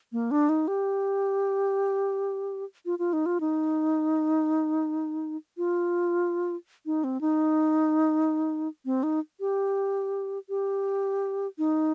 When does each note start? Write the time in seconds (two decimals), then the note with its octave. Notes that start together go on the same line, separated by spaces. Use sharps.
0.12 A#3
0.31 D4
0.49 D#4
0.68 G4
2.86 F4
2.99 F4
3.13 D#4
3.26 F4
3.41 D#4
5.57 F4
6.86 D#4
7.04 C4
7.21 D#4
8.85 C4
9.03 D#4
9.40 G4
10.49 G4
11.58 D#4